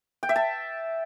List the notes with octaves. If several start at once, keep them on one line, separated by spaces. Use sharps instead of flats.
G5
E5
A5